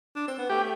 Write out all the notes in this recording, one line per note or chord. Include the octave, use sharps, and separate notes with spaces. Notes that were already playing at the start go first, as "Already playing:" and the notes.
D4
C4
B3
A3 G4